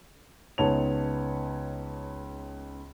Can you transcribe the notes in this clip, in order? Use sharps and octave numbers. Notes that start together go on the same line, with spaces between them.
C#2 B3 D#4 C#5 A5 F7